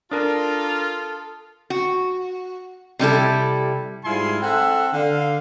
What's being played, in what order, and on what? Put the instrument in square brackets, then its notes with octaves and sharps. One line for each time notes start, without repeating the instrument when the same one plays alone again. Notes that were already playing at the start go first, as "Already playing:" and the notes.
[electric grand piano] D4 A#4 [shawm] F4 [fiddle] A4 [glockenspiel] A5 D#6
[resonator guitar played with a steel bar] F#4
C3 G3 E4 A4
[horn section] G#2 G3 E4 F4 G#5 C6
C4 A4 E5 F#5
D3 F5